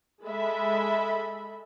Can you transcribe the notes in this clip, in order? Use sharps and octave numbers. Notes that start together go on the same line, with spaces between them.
G#3 A4 E5 B5